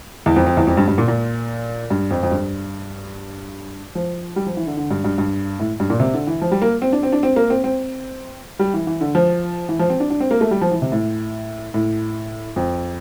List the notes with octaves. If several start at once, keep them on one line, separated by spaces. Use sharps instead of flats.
E2
F2
F2
E2
F2
G2
G2
A#2
A#2
G2
F2
F2
G2
F3
G3
F3
E3
D3
D3
G2
G2
G2
A2
G2
A#2
C3
D3
E3
F3
G3
A#3
C4
D4
C4
D4
C4
A#3
C4
C4
G3
E3
E3
D3
F3
E3
F3
C4
D4
D4
C4
A#3
A3
G3
F3
E3
C3
A2
A2
F2